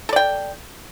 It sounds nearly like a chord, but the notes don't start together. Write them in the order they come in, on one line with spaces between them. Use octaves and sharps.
A4 D5 G5